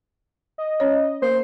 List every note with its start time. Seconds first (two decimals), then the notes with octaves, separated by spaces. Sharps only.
0.58 D#5
0.80 C#4 C#5
1.22 A#3 C5